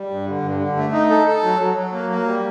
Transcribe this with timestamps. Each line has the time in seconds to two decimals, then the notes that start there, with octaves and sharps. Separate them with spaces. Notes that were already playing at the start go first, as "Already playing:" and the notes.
Already playing: G3
0.11 G2
0.27 D3
0.43 G2
0.60 D3
0.76 A3
0.93 D#4
1.10 A4
1.27 A4
1.43 F#3
1.60 F#3
1.76 F#3
1.92 A#3
2.10 A#3
2.26 G3